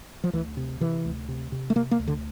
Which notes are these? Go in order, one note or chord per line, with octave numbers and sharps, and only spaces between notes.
F3
D2 E3
C3
C3 E3
D2
C3
C3
A3
C3 A#3
A#3
D2
D3